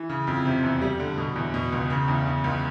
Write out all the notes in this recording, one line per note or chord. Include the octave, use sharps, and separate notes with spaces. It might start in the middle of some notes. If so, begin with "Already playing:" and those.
Already playing: E3
C#3
F2
C3
E2
G3
D3
B2
E2
B2
C#2
C#3
E2
C#3
C#2